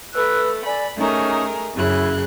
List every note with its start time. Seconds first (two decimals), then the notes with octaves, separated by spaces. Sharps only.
0.13 A3 B4 E6 F#6
0.64 D5 G#5 B5
0.96 A3 C#4 D#4 G#4 A#4
1.74 F#2 C#3 E4 F#6